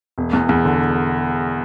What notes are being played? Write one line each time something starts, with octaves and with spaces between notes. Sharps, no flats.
E1
E2
E2
D3